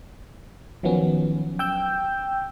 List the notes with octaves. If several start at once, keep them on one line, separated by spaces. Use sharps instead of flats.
D#3 F3 F#3 B3 C#4
G5 E6 G6